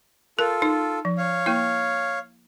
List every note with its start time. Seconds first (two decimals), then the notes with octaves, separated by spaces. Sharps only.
0.39 F4 A4 A#4
0.62 D#4
1.05 F3
1.18 C#5 F5
1.46 A#3 E4